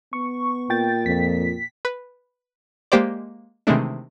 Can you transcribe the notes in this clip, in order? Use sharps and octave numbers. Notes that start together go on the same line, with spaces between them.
B3 C#6
A#2 G5 A6
F2 B6
B4
G#3 A#3 G4 C5 D5
C3 D#3 E3 G#3 A3 D4